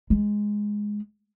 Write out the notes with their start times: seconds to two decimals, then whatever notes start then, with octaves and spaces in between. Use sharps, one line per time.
0.10 G#3